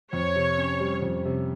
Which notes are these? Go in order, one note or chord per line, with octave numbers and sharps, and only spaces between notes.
F2 C#5
C3
C#4
G3
F2
C3